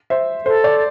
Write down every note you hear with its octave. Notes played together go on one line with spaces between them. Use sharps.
C5 E5
A4 C5
D5